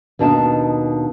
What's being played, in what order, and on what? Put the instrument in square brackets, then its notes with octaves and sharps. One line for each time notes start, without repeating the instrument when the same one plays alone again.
[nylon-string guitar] D#2 B2 D4 D#4 G5 A5